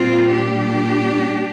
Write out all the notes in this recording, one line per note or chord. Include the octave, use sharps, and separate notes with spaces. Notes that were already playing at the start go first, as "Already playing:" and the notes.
Already playing: A#2 G3 C4 F4
D4 G4